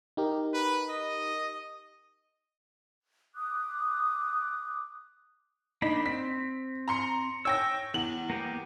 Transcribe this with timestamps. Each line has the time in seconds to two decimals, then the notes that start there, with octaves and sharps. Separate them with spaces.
0.17 D#4 G4 A#4
0.54 B4
0.89 D#5
3.35 D6 D#6 F#6
5.82 A#3 D4 D#4 B5
6.06 C4 B6
6.88 A#5 C6 C#7
7.45 C#5 G5 E6 A#6
7.94 E2 F#7
8.30 A#3 B3 G4